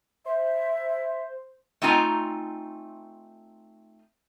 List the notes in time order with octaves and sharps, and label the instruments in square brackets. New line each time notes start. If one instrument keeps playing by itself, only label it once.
[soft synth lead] C5 [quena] E5
[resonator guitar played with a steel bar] A3 C4 D#4 F4 G#5 A#5